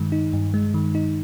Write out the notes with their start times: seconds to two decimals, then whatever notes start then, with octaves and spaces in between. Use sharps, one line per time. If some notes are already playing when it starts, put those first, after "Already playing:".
Already playing: G2 D#3 G#3
0.12 D#4
0.33 G2
0.54 G#3
0.74 D#3
0.95 D#4